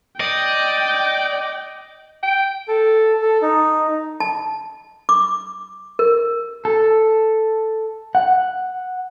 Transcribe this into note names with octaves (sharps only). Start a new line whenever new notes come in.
D5 D#5 G5
G5
A4
A4
D#4
A5
D6
A#4
A4
F#5